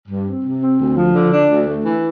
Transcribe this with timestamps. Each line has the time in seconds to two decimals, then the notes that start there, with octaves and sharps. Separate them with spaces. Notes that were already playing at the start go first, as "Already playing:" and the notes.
0.08 G2
0.26 C4
0.44 C3
0.62 C4
0.79 D2
0.96 F3
1.14 D3
1.32 D4
1.49 D2
1.67 A3
1.84 E3